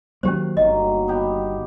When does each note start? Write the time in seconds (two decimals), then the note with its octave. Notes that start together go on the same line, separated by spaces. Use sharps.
0.23 D#3 F#3 A#3 C#4 G4 C5
0.57 G1 D#3 F#3 A#3 D#5
1.08 B3 G4